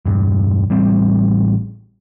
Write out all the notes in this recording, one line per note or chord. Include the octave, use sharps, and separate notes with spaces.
E1 G2
A1 G3 C4